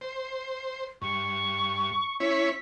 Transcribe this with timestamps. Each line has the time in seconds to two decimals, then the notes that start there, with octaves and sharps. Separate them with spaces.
0.01 C5
1.02 G2 C#6
2.20 C#4 E4 C#5 B6